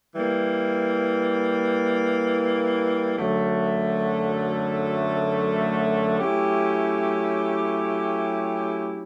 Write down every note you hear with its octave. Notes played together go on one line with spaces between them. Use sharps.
E3 G3 A#3
F#2 D3 F#3 A3
F#3 A3 C#4 E4 G4